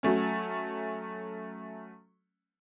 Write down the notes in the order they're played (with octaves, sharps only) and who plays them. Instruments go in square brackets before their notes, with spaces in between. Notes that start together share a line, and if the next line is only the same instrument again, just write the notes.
[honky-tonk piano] F#3 A3 C#4